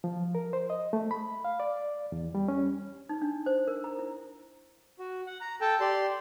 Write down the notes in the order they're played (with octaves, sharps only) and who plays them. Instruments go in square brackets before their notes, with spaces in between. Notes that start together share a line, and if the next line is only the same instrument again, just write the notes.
[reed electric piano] F3
A#4
C5
D#5
A3
B5
F5
D5
E2
G3
C#4
[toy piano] D#4
D4
C5
A#4
A#5
E4
[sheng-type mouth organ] F#4
F#5
A#5
A4 G5 A5
G4 D5 C6